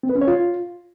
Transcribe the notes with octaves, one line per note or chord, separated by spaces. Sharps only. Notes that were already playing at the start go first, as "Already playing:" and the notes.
C4
B4
C#4
C#5
F4